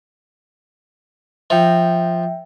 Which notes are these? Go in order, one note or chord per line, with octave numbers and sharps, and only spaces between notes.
F3 E5 G5